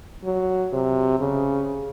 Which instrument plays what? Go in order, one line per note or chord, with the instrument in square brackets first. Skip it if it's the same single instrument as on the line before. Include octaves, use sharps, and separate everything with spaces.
[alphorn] F#3
C3
C#3